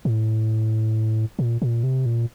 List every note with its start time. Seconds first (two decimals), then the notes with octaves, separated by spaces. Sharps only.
0.05 A2
1.39 A#2
1.62 A#2
1.83 C3
2.06 A#2